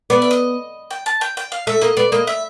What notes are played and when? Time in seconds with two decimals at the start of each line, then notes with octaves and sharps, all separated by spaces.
0.10 B3 D5
0.22 E5
0.31 D#5
0.91 G5
1.06 A5
1.21 G5
1.37 G5
1.52 F5
1.67 A3 E5
1.81 A#3 D#5
1.97 B3 D5
2.12 A#3 D#5
2.27 E5